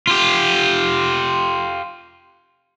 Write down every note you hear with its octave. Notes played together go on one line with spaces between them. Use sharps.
F4 G4